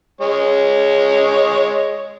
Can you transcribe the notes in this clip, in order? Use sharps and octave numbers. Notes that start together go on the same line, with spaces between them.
G#3 C#5